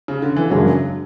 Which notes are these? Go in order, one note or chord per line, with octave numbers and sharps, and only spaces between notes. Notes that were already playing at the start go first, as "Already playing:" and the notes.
C#3
D3
E3
F#2 C#3 F#3 G#3 D4 F#4